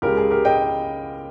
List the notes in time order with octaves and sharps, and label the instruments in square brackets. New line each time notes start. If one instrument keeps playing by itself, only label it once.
[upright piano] C#2 C#3 G#3 G4 A#4
G#4
G4 A#4
D#5 G5